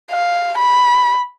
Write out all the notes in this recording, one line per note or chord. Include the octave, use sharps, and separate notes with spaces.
F5
B5